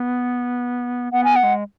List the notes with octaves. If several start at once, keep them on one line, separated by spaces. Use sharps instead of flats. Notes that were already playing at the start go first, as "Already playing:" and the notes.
Already playing: B3
B3 F#5
G#5
B3 F#5
G#3